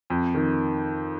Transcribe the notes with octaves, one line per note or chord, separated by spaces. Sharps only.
F2
D#3